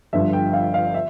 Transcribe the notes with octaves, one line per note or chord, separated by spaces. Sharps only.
G1 G2 D3 F3 E5
G5
F5
F5
E5